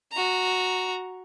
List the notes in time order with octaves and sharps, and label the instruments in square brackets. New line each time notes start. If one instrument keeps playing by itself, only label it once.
[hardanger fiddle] F#4 A#5